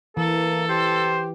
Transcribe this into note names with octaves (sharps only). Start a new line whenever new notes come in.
E3 A#3 A4
G4 C5